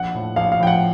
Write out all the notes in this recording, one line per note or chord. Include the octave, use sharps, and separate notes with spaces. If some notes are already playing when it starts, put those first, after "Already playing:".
Already playing: A#1 F#5
A2 F3
A#1 F5
F5
A2 F3 G5
F#5